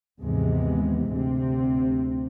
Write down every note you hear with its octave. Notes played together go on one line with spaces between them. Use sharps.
D#2 G#2 C3 E3 G#3 B3
D2 C3 C4